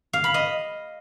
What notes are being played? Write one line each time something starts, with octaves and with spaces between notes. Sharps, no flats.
F5
B5
D#5